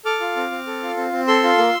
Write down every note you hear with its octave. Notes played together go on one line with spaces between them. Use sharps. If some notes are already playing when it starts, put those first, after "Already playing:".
A4 D6 F6
F4
C4
C4
A4
F4
C4
C4
A4 C6 E6
F4
A#3